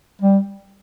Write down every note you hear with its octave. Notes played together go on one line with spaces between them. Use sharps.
G3